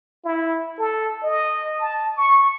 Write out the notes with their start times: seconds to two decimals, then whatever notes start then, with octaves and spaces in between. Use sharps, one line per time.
0.25 E4
0.79 A4
1.23 D#5
1.80 A5
2.17 C#6